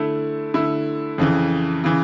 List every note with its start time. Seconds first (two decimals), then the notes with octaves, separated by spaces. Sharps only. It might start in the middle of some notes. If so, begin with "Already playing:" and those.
Already playing: D3 A3 E4
0.54 D3 A3 E4
1.18 F2 C#3 E3
1.84 C#3 E3